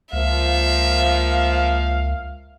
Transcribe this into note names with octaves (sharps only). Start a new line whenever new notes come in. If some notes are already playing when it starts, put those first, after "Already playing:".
C#2 F3 A#3 E5 F5